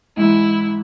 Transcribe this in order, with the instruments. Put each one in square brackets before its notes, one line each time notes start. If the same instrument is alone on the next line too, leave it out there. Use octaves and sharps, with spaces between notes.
[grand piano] G#2 E3 G#3 [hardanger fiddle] E4